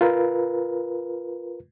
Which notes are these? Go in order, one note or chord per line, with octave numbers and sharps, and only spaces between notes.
F4 A#4 B4